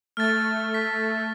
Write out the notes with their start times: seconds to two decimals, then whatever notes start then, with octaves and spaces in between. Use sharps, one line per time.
0.17 A3 F6 A6
0.74 B6